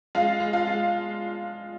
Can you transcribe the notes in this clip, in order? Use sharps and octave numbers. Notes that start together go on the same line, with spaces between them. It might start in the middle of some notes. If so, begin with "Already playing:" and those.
G#3 F4 F5
G#3
F4 F5
G#3